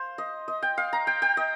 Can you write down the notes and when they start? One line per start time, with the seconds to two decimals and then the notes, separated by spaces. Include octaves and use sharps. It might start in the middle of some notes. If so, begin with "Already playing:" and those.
Already playing: C5 F5
0.18 D#5
0.48 D#5
0.62 G5
0.78 F5
0.93 A#5
1.07 G5
1.22 G5
1.37 D#5